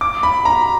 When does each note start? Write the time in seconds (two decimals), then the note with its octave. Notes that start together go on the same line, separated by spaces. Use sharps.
0.01 D6
0.23 B5
0.45 A#5